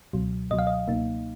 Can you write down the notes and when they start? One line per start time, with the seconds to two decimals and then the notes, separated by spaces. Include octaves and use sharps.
0.13 C#2 B2 F#3
0.50 C#2 B2 F#3 D#5
0.59 F5
0.67 D#5
0.88 C#2 B2 A#3 D#4